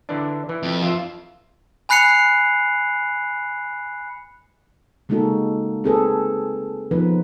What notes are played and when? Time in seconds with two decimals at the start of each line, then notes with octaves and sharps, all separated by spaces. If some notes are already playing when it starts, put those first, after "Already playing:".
0.09 D3 E3 D4
0.49 E3
0.63 F2
0.83 F4 E5
1.89 G#5 B5 F#6 C7 C#7 F7
5.09 C#3 G#3 A#3 D#4 F#4 A4
5.84 C4 G#4 A4 B4
6.91 F3 B3 D#4 B4